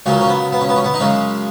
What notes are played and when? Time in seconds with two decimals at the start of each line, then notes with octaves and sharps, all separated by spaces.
0.06 C#2 C#3 F#3 A#3 C#4
0.21 C#4
0.29 B3
0.53 B3
0.61 C#4
0.69 B3
0.76 C#4
0.84 B3
0.94 D#4
1.00 F#2 C#3 G#3 C#4